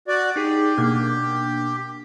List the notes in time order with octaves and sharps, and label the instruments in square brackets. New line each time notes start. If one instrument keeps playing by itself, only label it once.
[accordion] F#4 D5
[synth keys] D#4 G#4 [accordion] G4
[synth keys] B2 A#3 D4